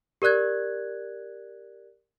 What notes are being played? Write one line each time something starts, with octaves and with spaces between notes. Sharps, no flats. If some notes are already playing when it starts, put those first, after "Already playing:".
G4 A#4 D5 F#6 G#6